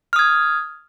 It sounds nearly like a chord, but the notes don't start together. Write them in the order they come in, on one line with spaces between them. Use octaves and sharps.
F6 D#6 G#6